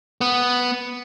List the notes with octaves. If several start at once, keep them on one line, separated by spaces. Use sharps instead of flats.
B3